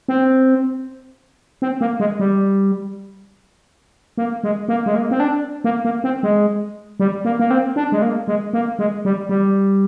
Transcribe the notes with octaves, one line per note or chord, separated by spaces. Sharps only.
C4
C4
A#3
G#3
G3
A#3
G#3
A#3
G#3
A#3
C4
D4
A#3
A#3
C4
G#3
G3
A#3
A#3
C4
D4
G#3
A#3
G#3
A#3
G#3
G3
G3